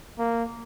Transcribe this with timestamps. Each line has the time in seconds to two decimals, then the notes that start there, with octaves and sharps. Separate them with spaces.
0.19 A#3